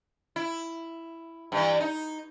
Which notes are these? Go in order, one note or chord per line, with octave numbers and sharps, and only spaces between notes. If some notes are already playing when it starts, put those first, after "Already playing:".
E4
G2 E3
D#4